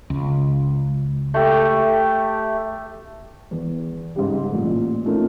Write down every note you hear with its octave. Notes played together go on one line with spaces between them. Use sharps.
C#2
A3 G4
E2
G#2 C#3 G3
A1 A#2
A3 A#3 C#4 D#4 F4